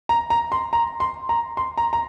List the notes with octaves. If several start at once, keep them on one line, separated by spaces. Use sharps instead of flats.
A#5
A#5
C6
A#5
C6
A#5
C6
A#5
A#5